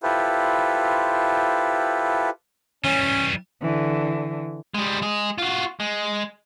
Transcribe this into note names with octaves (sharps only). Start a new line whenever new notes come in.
E4 F4 G4 A4 B4 C5
E3 G3 C#4
D3 E3
G3 G#3
G#3 G#4
F4 F#4
G#3